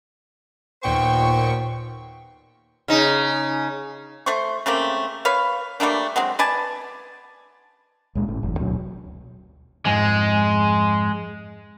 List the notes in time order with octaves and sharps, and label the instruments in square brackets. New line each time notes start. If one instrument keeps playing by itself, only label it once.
[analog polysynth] D#2 A#2 C#6 [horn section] B3 C5 G5
[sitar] C#3 D#4
[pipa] A3 C5 C#6
C#3 A3 A#3 C4
B4 C#5 F5
G3 A3 A#3 D4
F#3 G#3 C4
B4 D5 G#5 A5
[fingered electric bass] C#2 A#2 G#3
G#1 A2
F#1 E2
D2 B2 F#3
[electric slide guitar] F2 G#2 G#5 [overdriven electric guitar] G#3